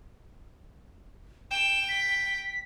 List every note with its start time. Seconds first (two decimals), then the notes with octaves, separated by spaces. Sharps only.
1.51 G5 E7
1.89 B6